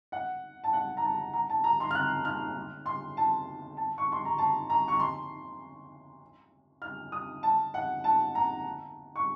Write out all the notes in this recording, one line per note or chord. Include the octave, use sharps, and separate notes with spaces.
F#5
A5
F#5
A#5
A5
A#5
A5
A#5
C6
F6
F#6
F6
C6
A5
A5
C#6
C6
A#5
A5
A#5
C#6
C6
F6
D#6
A5
F#5
A5
A#5
C#6